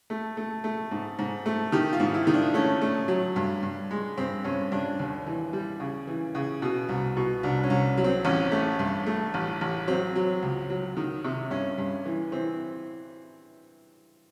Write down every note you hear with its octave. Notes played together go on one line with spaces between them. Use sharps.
A3
A3
A3
G#2
G#2
A3
D#3 G4
F4
G#2
E4
D#3
D4
A3 C#4
A3
F#3
G2
G2
G#3
G2 C4
G2 C#4
G2 D4
D#2
E3
G3
C#3
E3
C#3
B2
C2
B2
C2 D4
C#4
C2
F#3
C4
A1 C#4
A3
G2
A3
A1
A1
F#3 C4
F#3
C#2
F#3
D#3
C3
G2 C#4
G2
E3
E3 C4